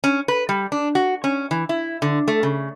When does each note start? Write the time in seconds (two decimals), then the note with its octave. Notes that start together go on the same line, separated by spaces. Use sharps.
0.04 C#4
0.28 B4
0.49 G3
0.72 D4
0.95 F#4
1.24 C#4
1.51 E3
1.69 E4
2.02 D3
2.28 A3
2.43 C#3